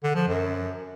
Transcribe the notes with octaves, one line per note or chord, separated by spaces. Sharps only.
D3
F3
F#2